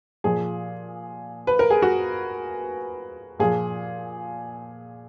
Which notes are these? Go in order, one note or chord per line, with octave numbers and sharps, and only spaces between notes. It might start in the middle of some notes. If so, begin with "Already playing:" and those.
A#2 F3 G#4
B4
A#4
G#4
F#4
A#2 F3 G#4